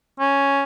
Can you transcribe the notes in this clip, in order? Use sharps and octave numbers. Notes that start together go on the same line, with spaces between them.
C#4